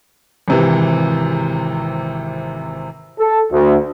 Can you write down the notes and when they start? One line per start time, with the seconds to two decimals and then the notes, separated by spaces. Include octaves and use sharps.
0.48 G#1 C3 E3
3.20 A4
3.52 D2